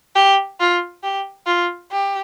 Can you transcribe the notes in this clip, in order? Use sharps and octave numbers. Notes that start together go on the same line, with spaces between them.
G4
F4
G4
F4
G4